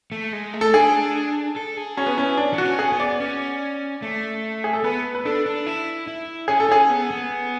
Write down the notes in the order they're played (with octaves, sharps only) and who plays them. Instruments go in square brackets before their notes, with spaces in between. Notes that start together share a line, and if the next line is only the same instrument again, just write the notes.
[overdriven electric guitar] A3
G#3
A3
[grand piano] A4
[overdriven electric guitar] D4 [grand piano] G#4
[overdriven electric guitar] A4
G#4
[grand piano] C#4 [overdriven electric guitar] F#4
[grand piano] B3
[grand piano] C#4 [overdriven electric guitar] E4
[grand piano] D4
[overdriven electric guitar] B3 [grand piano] F#4
[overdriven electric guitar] C#4
[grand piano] G#4
[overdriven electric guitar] B3
[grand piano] D5
[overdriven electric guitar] C#4
A3
[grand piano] G#4
A4
[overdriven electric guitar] B3 [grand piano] B4
[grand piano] B4
[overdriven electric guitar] D4 [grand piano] A4
[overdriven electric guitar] D4
E4
E4
[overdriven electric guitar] C#4 [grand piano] G#4
[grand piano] A4
[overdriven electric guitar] C#4 [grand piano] G#4
[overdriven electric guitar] B3
B3